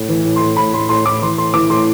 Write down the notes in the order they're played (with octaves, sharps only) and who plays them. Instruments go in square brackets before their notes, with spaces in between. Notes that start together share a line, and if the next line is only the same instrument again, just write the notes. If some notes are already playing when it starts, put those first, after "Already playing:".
Already playing: [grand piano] A2
E3
A2
C6
A2
A2 B5
A2 C6
A2 C6
A2 D6
E3 C6
A2 C6
E3 D6
A2 C6